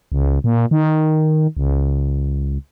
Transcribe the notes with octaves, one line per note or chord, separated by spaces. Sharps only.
C#2
A#2
D#3
C#2